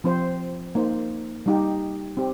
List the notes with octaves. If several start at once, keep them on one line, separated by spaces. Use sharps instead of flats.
F3 C4 F4 C5
A#3 D#4 C5
G3 D#4 G4
C4 G4